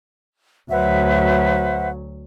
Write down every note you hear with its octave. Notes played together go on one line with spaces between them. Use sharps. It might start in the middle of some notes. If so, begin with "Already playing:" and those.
D2 F#3 B4 C5 E5 F#5